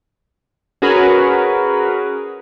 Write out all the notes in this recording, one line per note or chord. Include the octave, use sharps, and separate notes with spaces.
C#4 F#4 G#4 A#4 B4